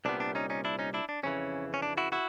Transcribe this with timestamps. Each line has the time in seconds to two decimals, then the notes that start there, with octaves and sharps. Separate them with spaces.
0.05 C2 A#2 G3 B3 D4
0.20 D4
0.35 C#4 D#4
0.50 C#4 D#4
0.65 D4 E4
0.79 C#4 D#4
0.94 D4 E4
1.09 D4
1.23 F2 C#3 E3 C#4
1.74 C#4
1.82 D4
1.97 E4 F#4
2.12 E4 F#4